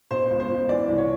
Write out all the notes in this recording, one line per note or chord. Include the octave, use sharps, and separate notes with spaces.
B2 C5
C#2
C5
C#2
E3 D5
C2
C#5